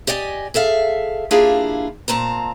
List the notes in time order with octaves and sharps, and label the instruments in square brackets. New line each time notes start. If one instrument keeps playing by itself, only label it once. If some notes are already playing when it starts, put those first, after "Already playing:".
[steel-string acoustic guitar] G4 D5 D#5 F#5 G#5
G#4 A4 E5 F5
A#3 D4 E4 F4 G4 G#4
A#2 C4 A5 A#5